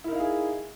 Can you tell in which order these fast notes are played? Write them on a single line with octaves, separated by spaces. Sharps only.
E4 A#4 D#4 F5 G#4